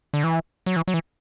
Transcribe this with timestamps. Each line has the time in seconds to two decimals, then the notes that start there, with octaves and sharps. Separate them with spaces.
0.14 D3
0.24 E3
0.66 F#3
0.76 E3
0.88 F#3
0.94 E3